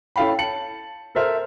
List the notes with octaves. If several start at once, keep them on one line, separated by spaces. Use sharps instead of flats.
C#4 E4 A4 F5 G5 B5
A5 C#7 F#7
A4 A#4 C5 E5 F6